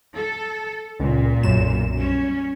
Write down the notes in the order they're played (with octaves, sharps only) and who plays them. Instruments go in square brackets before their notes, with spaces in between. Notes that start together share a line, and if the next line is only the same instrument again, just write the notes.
[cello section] A4
[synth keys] C#2 [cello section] A#2
[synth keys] B1 F#2 E7
[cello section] G3 C#4